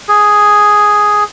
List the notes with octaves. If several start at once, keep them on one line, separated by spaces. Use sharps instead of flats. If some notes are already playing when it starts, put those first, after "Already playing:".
G#4